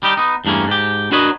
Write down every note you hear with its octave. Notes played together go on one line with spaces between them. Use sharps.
G3 D#4 G4
B3 D#4
E2 G2 A3 A#3 C#4
G#2 G4
D4 F#4 A#4 B4 C#5 D#5